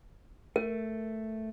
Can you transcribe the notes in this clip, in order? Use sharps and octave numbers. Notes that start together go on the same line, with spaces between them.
A3 A#4